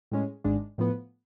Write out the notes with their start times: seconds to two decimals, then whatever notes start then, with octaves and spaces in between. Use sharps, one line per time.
0.11 A2 G#3 C#4
0.44 G#1 G#2 G#3 D4
0.78 A2 F3 B3